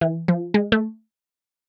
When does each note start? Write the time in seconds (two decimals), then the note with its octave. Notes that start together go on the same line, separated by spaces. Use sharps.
0.01 E3
0.28 F3
0.54 G#3
0.72 A3